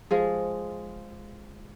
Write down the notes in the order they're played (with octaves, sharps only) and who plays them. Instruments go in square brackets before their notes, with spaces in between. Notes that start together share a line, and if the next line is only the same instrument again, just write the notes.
[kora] F3 G#3 G#4